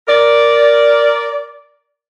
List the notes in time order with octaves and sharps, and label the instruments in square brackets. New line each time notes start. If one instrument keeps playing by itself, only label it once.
[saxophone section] A#4 D5